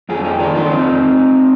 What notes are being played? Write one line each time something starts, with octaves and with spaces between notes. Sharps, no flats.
F2 F4 G#4
A#3 D#4 G4
D#3 D4 F4
F2 D4 F4
D4
F2 C4 D#4